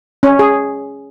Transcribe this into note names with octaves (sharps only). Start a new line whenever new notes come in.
C#4
G#4